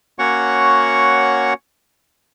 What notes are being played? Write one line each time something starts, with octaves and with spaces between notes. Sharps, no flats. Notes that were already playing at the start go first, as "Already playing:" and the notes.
A#3 C#4 F#4 C#5 F#5 C#6